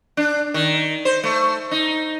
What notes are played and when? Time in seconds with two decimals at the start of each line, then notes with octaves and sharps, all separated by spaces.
0.17 D4
0.54 D#3
1.05 C5
1.24 A3
1.71 D#4